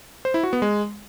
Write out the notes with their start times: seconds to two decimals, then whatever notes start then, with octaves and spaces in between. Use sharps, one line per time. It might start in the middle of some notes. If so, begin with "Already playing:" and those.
0.25 C5
0.34 E4
0.43 F#4
0.53 B3
0.62 G#3